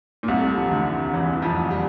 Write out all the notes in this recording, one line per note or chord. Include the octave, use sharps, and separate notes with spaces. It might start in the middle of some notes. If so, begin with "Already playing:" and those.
A#2
C2 C3
A3
G3
F3
E3
D2 D3
E2 E3
E3
F2 F3
G3